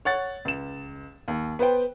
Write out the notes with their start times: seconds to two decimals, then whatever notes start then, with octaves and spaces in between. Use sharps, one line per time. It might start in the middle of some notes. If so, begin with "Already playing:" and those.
0.05 C#5 F#5 A6
0.45 C#2 E7
1.28 D#2
1.59 B3 B4 C5 G5